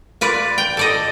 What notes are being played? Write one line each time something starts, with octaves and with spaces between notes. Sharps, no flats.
F4 B4 D5
G5
A4 D5 D#5